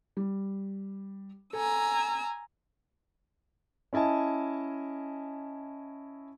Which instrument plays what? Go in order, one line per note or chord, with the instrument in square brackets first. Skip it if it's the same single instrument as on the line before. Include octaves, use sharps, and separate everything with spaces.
[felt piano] G3
[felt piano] A4 [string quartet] G#5 A#5 E6
[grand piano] C#4 E4 D#5 G#5 A5